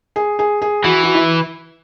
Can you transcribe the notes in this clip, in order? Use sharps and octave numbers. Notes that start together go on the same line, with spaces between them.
G#4
G#4
G#4
E3 F#4
F#4
E4